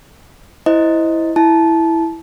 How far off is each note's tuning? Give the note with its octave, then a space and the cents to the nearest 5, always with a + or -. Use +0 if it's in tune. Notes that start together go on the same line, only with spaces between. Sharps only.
E4 +0 C5 +0 D#5 +5
E4 +0 A5 -20